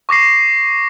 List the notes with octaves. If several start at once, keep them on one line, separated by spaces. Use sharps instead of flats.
C#6 D6 A#6 C7